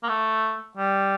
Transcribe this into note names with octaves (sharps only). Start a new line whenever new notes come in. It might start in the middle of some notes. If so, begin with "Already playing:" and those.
A#3
A3
G3